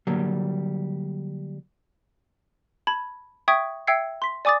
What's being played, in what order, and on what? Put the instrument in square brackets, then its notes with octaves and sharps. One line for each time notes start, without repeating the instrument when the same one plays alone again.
[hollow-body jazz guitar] D3 F#3 G3 A#3
[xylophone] A5 B5 G#6
E5 G5 C#6 D#6 G#6 B6
E5 G5 E6 G#6 C7 C#7
C6 B6
D5 G#5 D6 D#6 A6